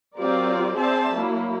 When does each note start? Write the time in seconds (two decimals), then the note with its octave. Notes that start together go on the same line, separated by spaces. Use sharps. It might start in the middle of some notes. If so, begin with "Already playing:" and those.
0.16 F#3 C4 F4 G4 A#4 D5
0.76 C4 G#4 C5 D5 E5 A5
1.15 F#3 A#3 E4